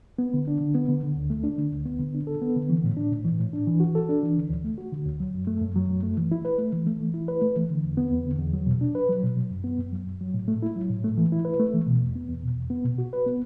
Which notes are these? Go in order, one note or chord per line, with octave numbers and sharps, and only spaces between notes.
B3
D3
D4
D3
B3
D3
D3
D2
A3
D4
D3
D2
B3
D3
D4
A4
B3
D3
E3
A2
D4
A2
E3
A2
D4
E3
F#4
A4
D4
E3
D3
D2
A3
F#4
D3
D2
F#3
F#2
A3
F#2
F#3
F#2
A3
E3
E4
B4
A3
E3
A3
E3
E4
B4
A3
E3
D3
E2
B3
E2
D3
E2
F#3
B2
D4
B4
F#3
B2
F#3
F#2
B3
F#2
F#3
F#2
F#3
A2
A3
E4
F#3
A2
A3
E3
E4
B4
A3
E3
B2
E2
B3
E2
B2
E2
B3
B2
F#4
B4
B3